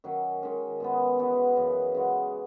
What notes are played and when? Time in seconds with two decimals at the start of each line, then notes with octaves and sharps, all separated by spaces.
0.04 D#3 F#3 C#4
0.43 D#3 G#3 C#4
0.80 B2 G#3 B3
1.19 E3 G#3 B3 F#4
1.56 F#2 C#3 E3
1.95 C#3 G#3 B3 F#4